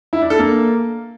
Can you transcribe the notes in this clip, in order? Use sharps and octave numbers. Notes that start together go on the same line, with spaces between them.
E4
D4
A4
A#3